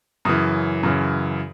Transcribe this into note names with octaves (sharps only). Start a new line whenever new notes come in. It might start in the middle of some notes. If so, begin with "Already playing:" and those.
F#2 C#3 E3 D#6
F#2 C#3 E3